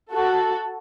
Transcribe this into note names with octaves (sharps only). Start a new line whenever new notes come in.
F#4 A4